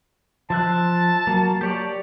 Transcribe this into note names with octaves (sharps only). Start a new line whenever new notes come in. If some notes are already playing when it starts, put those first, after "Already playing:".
F3 E5 A5 F#6
F#3 A#3
G4 C#5 D5